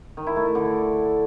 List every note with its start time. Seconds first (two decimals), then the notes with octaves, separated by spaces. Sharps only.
0.17 D#3
0.27 E4
0.36 A3
0.46 E4
0.55 D3